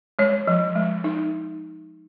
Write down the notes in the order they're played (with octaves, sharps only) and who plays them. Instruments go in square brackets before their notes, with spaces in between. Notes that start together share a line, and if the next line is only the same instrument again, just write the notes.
[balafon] G#3 C#5
F3
G#3
D#4